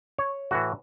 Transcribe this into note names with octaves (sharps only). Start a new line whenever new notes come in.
C#5
A2 E3 F#4